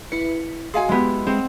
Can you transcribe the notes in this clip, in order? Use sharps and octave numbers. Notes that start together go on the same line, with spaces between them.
E4 B4 C#7
F#4 G#4 D#5 F5 G#5 C6
G#3 B3 E4 G4
G#3 C4